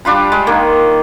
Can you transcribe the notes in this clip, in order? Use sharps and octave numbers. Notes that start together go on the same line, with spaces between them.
G3 D4 F4 B5
G#3
D#3 A#3